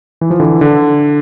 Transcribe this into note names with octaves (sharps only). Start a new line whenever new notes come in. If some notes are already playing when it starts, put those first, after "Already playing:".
E3
F3
D3 E3
D3